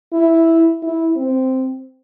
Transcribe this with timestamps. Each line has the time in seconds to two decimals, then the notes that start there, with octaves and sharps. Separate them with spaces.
0.13 E4
0.82 E4
1.17 C4